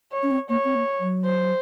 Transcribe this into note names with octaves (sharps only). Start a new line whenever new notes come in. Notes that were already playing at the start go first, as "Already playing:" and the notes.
C#5
C#4
C4
A#3 C#5
C4
A#3
F#3
C5